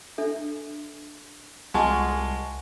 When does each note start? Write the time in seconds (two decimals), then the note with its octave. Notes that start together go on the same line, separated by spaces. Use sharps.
0.18 D4 A4 E5
1.74 C2 G#3 F4 F#5 G#5 A5 C#6